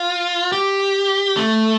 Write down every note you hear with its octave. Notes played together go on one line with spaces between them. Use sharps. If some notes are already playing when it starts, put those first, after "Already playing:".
Already playing: F4
G4
A3